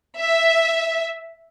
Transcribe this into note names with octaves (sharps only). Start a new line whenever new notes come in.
E5